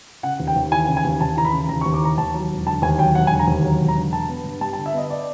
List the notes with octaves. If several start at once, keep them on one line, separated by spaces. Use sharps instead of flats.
C#3 F#5
D#2
G5
D#2
E3 G#5
C#3
G#5
D#2
D#2 A5
E3 A#5
B5
C#3
D#2 A#5
C#6
D#2
D6
E3 A#5
D#2 A5
F#3
E1
D3 A5
D#2 G#5
F#3 G5
E1 F#5
G#5
D3
A#5
D#2
F#3
E1
A#5
D3
D3 A5
B3
G2
G3 A5
A5
D3
E5
B3 D#5
D5